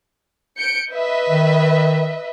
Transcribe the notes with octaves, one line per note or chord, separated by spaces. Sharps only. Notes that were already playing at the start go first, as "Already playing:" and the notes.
G6 C#7 D7
B4 D#5 E5
D#3